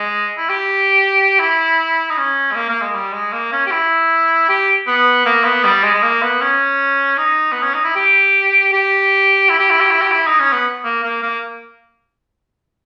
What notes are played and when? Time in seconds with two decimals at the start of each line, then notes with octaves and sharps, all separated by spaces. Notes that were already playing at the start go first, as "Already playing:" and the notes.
Already playing: G#3
0.38 E4
0.49 G4
1.39 E4
2.10 D#4
2.17 C#4
2.51 G#3
2.55 A#3
2.69 A#3
2.81 G#3
2.95 G3
3.13 G#3
3.32 A#3
3.52 C#4
3.67 G4
3.71 E4
4.49 G4
4.87 B3
5.25 A#3
5.44 B3
5.64 G3
5.83 G#3
5.94 G#3
6.02 A#3
6.22 B3
6.41 C#4
7.18 D#4
7.52 B3
7.62 C#4
7.73 D#4
7.84 E4
7.95 G4
8.72 G4
9.49 E4
9.59 G4
9.71 E4
9.81 G4
9.91 E4
10.01 G4
10.12 E4
10.27 D#4
10.39 C#4
10.52 B3
10.84 A#3
11.03 A#3
11.23 A#3